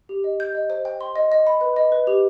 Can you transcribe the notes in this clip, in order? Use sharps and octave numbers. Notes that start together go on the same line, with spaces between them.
G4
D#5
G6
D#5
C5
G5
C6
D#5
D#5
B5
B4
D#5
B4
G4